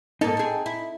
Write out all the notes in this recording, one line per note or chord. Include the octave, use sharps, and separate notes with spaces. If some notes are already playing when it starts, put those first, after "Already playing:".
G#2 A#3 D#4 A4
C4 G#4
E4